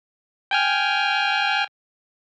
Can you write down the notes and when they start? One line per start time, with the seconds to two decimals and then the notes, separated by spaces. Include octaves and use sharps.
0.51 G5 G#5 F6